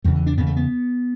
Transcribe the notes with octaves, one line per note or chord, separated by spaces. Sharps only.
E2 C#3 G3
E3
D4
E2 C#3 B3
A3
B3